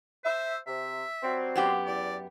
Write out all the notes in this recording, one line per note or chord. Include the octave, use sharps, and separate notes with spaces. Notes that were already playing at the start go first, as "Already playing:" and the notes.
C5 E5
C3 E5
F#3 G3 C4
F#2 B3 G4
E2 D5